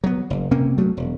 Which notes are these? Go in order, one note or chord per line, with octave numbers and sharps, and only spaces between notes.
F#3 B3
F#1
C3 A#3 C4 C#4
G2 F#3 A3
E1